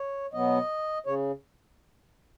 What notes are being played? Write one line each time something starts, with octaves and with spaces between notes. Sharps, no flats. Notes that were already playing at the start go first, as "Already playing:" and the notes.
Already playing: C#5
B2 F#3 B3 D#5
C#3 C#5